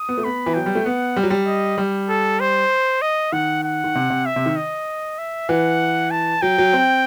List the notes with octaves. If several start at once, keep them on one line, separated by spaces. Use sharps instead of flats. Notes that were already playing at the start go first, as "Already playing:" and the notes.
Already playing: D#6
B3
A3
B3 B5
E3
F#3 G5
G3
A3
B3 F#5
G3
F#3
G3
D#5
G3
A4
C5
D#5
D#3 F#5
F#5
D#3
C3
C3
E5
C3
D#3
D#5
E5
E3 F#5
A5
F#3 G5
F#3
C4